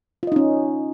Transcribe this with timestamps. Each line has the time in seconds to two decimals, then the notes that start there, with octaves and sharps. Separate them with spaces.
0.23 F4
0.27 D#5
0.32 D#4
0.36 C#4